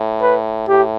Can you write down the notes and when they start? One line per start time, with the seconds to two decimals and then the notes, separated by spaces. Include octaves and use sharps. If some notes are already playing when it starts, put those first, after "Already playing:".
Already playing: A2
0.22 B4
0.68 A2 G4